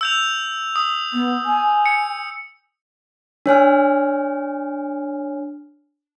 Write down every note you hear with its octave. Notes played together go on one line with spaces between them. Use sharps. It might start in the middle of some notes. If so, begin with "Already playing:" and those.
E6 G6 F7
D#6
B3
G#5
C#7
D4 C#5 G#5 F6